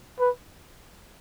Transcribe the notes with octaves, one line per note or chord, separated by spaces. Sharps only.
B4